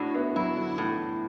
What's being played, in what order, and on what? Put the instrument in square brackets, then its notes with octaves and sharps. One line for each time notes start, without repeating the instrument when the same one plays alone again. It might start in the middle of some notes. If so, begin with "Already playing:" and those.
Already playing: [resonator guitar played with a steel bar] A2 [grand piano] D4 F#4
[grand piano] B3 E4
[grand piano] F#3 B3 [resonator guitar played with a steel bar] E4
[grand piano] D3 F#3
[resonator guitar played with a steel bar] A2 [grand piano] E3 A3